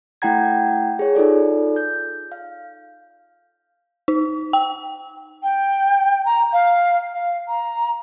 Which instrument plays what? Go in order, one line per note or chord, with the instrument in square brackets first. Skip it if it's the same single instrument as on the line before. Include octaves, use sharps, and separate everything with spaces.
[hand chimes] A3 E4 F#5 G5 A#5 G#6
G#4 C#5
D#4 F4 A4 D5
G6
F5
[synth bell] D#4
G5
[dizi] G5
A#5
F5
F5
A#5